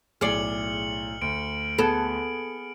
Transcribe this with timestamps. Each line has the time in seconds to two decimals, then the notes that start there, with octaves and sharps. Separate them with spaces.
0.21 B1 A2 G#4 D5 F6 C#7 F#7
1.22 D2 D7
1.78 B3 G#4 A4 F#5